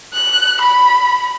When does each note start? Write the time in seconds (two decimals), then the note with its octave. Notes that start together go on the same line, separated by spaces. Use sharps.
0.14 F#6
0.61 B5